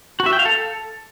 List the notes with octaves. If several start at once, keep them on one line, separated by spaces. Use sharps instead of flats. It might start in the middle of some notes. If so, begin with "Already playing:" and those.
F#4
E5
G5
F5
A4